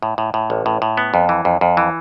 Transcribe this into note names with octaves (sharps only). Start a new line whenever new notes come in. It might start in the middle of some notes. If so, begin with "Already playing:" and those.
A2
A2
A2
A1
A2
A2
B3
F2
E3
F2
F2
E3